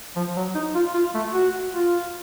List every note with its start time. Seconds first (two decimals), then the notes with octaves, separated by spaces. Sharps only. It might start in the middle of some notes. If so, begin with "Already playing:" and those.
0.16 F3
0.36 F#3
0.55 D#4
0.75 F4
0.94 F4
1.14 A3
1.33 F#4
1.72 F4